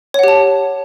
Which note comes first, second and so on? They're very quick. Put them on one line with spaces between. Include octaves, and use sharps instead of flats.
C#5 F#5 G4 A5